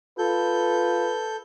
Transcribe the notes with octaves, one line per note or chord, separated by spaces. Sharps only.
F4 A4 B4 G6